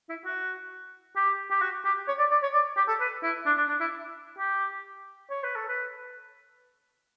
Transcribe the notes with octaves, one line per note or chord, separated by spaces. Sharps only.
E4
F#4
G4
G4
F#4
G4
C#5
D5
D5
C#5
D5
G4
A4
B4
E4
D4
D4
D4
E4
G4
C#5
B4
A4
B4